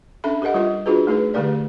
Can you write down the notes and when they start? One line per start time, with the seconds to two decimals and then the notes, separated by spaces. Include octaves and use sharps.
0.24 C#4 D4 A4 E5 B5
0.42 G4 A4 A#4 D#5 F#5
0.54 G3 F4 A#4 D#5
0.86 D4 F4 F#4 G#4 B4
1.07 A3 D#4 G#4 B4
1.34 D3 G#3 A3 G4 A#4 D5